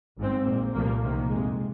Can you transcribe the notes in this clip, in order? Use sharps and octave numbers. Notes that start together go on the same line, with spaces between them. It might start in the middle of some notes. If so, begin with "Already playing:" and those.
G#1 G#2 G#3 C4
A#1 A#2 A#3
C2 A#2 F3 A#3
C2 C3 D#3 A#3
F2 C3 G#3